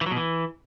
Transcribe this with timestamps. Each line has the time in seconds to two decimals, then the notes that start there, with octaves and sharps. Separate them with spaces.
0.01 E3
0.06 F#3
0.11 B2
0.17 E3